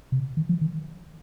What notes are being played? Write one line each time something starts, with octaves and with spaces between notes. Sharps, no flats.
C3
D#3
F3
D#3